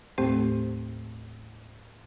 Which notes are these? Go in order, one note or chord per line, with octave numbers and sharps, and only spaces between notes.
D#2 A2 A3 C4 G4 C5